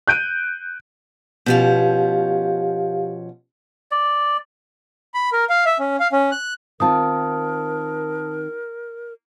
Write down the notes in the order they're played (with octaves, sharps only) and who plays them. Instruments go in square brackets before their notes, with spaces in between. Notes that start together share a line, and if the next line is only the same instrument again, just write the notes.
[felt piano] F#6 G6 D7 D#7
[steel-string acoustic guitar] B2 F3 C#4 [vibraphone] G4 F5
[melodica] D5
[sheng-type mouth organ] B5
A#4
F5
E5
C#4
F5
C#4
F#6
[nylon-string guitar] D#3 C4 F4 [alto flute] A#4 [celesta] A5 D#6